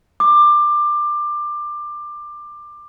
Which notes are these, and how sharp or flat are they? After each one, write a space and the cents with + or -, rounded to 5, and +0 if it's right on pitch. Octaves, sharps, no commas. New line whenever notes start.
D6 +20